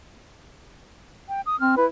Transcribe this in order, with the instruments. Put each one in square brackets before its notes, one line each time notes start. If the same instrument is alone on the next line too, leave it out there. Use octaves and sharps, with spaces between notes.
[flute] G5
D#6
[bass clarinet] C4 [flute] F6
[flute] E4 [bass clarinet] B4